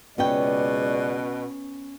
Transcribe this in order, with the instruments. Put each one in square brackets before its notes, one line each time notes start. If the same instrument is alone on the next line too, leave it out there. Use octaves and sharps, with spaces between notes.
[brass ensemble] F#1 C#2 D5 [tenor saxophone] B2 [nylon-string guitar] B3 C#4 G5